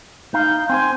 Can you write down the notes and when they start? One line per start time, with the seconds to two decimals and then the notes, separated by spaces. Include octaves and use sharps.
0.34 D#4 F5 G6
0.69 C4 C5 G#5